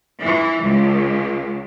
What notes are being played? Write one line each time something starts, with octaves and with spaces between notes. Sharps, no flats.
E3
C#2